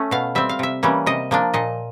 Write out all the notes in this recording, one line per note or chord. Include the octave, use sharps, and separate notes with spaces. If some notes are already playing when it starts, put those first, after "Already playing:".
Already playing: A3 C#4
B2 F5
G3 C4 E5
F5
C3 E5
E3 G3 A#3 C#4
C3 D#5
F3 A#3 D4
A#2 D#5